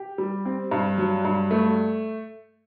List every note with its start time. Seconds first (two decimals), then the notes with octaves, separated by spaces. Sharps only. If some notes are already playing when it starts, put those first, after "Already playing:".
Already playing: G4
0.18 G3
0.45 C4
0.71 G2
0.98 F#3
1.25 G2
1.51 A3